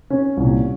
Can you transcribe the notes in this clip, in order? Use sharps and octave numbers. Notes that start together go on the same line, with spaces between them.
C#4
C2 A#2